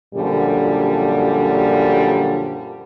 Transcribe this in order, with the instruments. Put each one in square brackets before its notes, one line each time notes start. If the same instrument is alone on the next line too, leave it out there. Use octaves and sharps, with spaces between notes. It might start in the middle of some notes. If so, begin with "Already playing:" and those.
[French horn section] F#2 A#2 D3 F3 G3